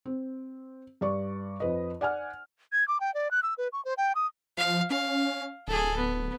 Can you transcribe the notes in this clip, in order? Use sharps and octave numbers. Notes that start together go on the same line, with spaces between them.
C4
G2 D5 C#6
F2 B4 D#5
D5 F#5 G#5 F6
G#6
D6
G5
D5
F#6
E6
B4
C#6
C5
G5
D#6
F3 F5
C#4 F5
D1 G#4 A4
B3